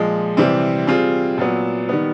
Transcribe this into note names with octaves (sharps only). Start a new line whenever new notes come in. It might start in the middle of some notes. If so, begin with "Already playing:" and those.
Already playing: A#2 F3 G#3
C3 E3 G3 C4
G3 C4 F4 G#4
A#2 F#3 B3
D#3 G3 B3